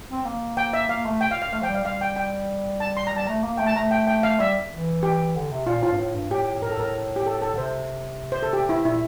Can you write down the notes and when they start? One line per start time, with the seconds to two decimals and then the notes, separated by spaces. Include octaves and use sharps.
0.10 C4
0.25 A#3
0.57 G5
0.73 E5
0.89 A#3 F5
1.06 A3
1.21 G5
1.31 F5
1.42 F5
1.52 A3 F5
1.62 F3 G5
1.69 G3
1.74 F5
1.84 G3 F5
2.01 G5
2.16 G5
2.80 A5
2.97 C6
3.07 A#5
3.13 G3 A5
3.27 A3 A#5
3.44 A#3
3.57 A3 G5
3.66 A5
3.76 A3 A#5
3.91 G5
4.07 G5
4.23 F5
4.40 G3 E5
4.72 E3
5.03 G4
5.36 D3
5.51 C3
5.66 A#2 F4
5.82 A2 F4
5.92 G2
5.98 A2
6.14 G2
6.30 A2 G4
6.62 A2 A#4
6.71 A4
6.78 A2 A#4
7.16 G4
7.26 A4
7.42 A4
7.53 D3
7.58 C3 C5
8.32 C5
8.43 A4
8.53 G4
8.69 E4
8.85 A#2 E4